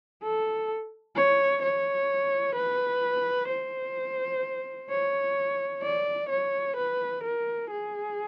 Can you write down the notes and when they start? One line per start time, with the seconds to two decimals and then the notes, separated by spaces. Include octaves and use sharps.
0.23 A4
1.15 C#5
1.63 C#5
2.56 B4
3.49 C5
4.90 C#5
5.83 D5
6.29 C#5
6.77 B4
7.24 A#4
7.70 G#4